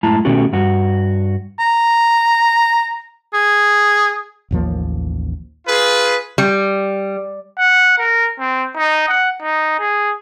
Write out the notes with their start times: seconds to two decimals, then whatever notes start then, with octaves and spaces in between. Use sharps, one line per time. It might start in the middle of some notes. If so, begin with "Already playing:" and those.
0.03 F#2 A2 G#3 E4 A5 A#5
0.25 B2 D#3 A3 C#4 F#4 G4
0.53 G2 F#4
1.60 A#5
3.34 G#4
4.51 A1 D#2 F3 A#3
5.67 F4 G#4 B4
6.38 G3
7.59 F#5
7.99 A#4
8.40 C4
8.77 D#4
9.09 F#5
9.42 D#4
9.80 G#4